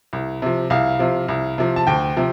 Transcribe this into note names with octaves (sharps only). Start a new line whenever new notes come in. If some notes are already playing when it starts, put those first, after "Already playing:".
C2
C3 F3
C2 F5
C3 F3
C2
C3 F3
A5
D2 G5
C3 F3